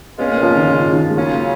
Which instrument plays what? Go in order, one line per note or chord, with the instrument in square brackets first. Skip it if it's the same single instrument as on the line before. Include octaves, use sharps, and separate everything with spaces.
[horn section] A#2 G#3 C#4 F4 [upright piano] B3
[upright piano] A#3
F3
D#3
C#3
D#3
G#3
[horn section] C#3 F#3 C#4 F4 [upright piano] A#3